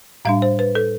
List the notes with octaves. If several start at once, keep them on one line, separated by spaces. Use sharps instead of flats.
A2 G3 D4 F5
C5
B4
A4